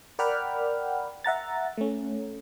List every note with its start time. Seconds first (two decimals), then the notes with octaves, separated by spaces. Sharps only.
0.19 A#4 D5 F#5 G5 B5 F6
1.24 E5 F#5 A#5 A6
1.77 A3 C#4